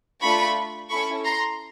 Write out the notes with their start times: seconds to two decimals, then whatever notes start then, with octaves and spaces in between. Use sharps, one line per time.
0.21 A3 D4 F4 B5 C#6
0.89 C#4 E4 A4 B5 C#6
1.25 A#5 C6